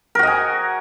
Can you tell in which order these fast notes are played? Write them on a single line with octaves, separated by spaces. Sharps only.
A#4 F#4 D#5 G#5